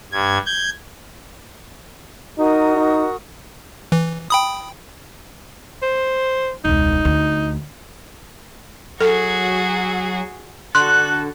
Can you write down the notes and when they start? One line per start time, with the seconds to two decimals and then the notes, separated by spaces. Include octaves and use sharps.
0.12 G2 G#6
0.46 G6 G#6
2.38 D#4 F#4 A#4 D#6
2.76 D#4
3.92 E3
4.30 G5 B5 D#6
5.82 C5
6.65 E1 C#2 D#4
7.05 D2
9.01 F#3 F#4 G#4 A4
10.75 D3 F#4 A4 C6 F#6